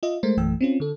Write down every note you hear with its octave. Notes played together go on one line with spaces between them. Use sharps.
F4 D#5 E5
G#3 A3 A#4 C5
A#1 F#2 E3 A3 G5 E6
C4 C#4 F4
D3 A4